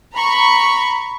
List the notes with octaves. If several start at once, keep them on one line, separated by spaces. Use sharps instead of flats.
A#5 B5 C#6